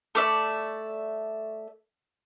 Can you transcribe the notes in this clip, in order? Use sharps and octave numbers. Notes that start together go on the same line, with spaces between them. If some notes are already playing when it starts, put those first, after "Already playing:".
A3 D5 E5